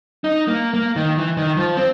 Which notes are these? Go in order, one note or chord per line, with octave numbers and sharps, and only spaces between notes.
D#4
A#3
A#3
D#3
E3
D#3
F3
C4